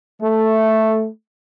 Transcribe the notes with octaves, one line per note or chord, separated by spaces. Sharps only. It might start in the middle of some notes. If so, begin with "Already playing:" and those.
A3